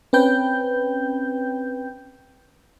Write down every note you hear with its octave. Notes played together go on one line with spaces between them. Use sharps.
C4 C#4 B4 G5 G6